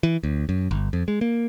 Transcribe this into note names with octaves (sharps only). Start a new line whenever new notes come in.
E3
D2
F#2
G1
F2
G#3
A#3